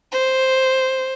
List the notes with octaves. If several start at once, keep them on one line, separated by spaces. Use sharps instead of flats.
C5